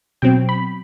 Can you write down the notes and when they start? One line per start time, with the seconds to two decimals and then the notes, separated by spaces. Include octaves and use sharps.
0.22 B2 F#3 C4 G5
0.49 B5